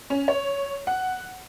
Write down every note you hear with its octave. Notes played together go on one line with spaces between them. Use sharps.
C#4
C#5
F#5